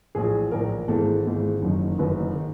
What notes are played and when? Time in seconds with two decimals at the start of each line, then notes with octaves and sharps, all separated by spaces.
0.15 A#1 A2 E3 G#4
0.51 A#1 A2 E3 A#4
0.88 G#1 G#2 E3 A4
1.25 G#1 G#2 E3
1.62 F#1 F#2 D#3
1.98 F#1 F#2 D#3 B4
2.36 D#3